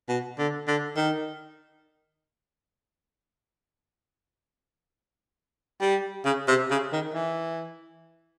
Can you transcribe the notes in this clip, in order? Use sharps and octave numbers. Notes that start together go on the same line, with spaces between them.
B2
D3
D3
D#3
G3
C#3
C3
C#3
D#3
E3